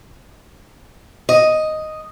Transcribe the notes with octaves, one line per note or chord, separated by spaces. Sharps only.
D#5